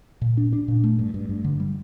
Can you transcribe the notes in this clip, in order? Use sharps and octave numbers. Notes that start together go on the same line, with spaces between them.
A#2
D4
D4
A#2
A3
G2
G2
G2
D3
G3